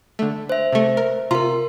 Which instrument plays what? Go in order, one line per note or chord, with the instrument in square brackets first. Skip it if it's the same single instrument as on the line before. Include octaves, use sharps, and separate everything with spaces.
[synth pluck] D3 A3
[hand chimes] C5 E5
[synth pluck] C3 A3
A#4
[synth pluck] C3 F4 A#5 [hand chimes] A#4 C6